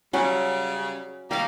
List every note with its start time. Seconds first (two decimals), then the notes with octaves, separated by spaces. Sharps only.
0.13 C#3 F#3 G3 C#4
1.31 D#3 G3 A#3 G4 F5